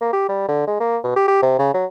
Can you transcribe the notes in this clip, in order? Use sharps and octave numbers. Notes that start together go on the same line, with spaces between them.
A#3
G4
G3
D3
G#3
A#3
B2
G4
G4
C3
C#3
F#3